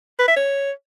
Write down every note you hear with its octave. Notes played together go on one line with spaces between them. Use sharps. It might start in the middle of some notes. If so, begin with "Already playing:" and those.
B4
E5
C#5